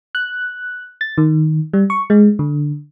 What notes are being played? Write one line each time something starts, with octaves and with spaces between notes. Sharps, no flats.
F#6
A6
D#3
G3
C#6
G#3
D3